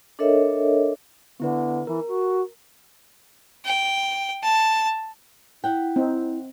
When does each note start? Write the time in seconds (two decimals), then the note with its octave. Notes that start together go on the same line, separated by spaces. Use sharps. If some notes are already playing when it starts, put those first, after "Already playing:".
0.19 D4 A4 A#4 C#5 D#5 E5
1.40 D3 B3 E4 B4
1.87 E3 A#4
2.08 F#4
3.65 G5
4.43 A5
5.64 E4 E5 F#5 G5
5.96 C4 D#4